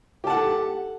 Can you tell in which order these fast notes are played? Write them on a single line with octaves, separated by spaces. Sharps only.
G4 A5 F#5 A4